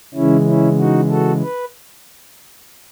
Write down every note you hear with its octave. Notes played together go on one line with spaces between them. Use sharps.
C#3 E3 G#3 C#4 E4
C#4 E4
D#4 F#4
F#4 A4
B4